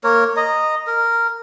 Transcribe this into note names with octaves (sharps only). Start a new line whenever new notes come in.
A#3 A#4 C#5
D#5 A#5
A#4